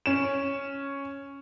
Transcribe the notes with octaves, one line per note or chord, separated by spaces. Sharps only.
C#4 E7